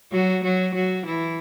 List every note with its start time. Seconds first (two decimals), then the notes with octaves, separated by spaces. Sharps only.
0.12 F#3 F#4
0.44 F#3 F#4
0.75 F#3 F#4
1.06 E3 E4